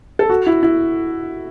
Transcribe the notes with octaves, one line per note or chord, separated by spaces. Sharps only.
A4
F#4
E4
E4